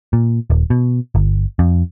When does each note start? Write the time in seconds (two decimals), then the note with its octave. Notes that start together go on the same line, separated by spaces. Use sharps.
0.13 A#2
0.50 D#1
0.70 B2
1.15 G1
1.59 F2